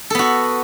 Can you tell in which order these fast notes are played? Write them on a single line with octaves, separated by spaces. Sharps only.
A4 B3 F#4